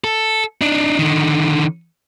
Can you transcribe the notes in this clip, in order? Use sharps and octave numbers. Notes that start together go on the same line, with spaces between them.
A4
D4 D#4
D3 D#3